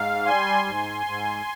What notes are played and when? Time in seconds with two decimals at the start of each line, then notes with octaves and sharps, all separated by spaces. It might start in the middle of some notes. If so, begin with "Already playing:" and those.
Already playing: G#2 F5
0.26 G3 G#5 C6
0.66 G#2
1.06 G#2